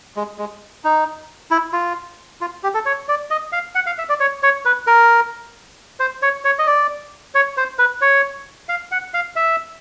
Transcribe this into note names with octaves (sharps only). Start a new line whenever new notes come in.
G#3
G#3
D#4
E4
F4
F4
G4
A4
C#5
D5
D#5
F5
F#5
F5
E5
D5
C#5
C#5
B4
A#4
C5
C#5
C#5
D#5
D5
C#5
C5
B4
C#5
F5
F#5
F5
E5